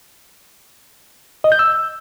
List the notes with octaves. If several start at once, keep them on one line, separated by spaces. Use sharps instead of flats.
D#5
G6
E6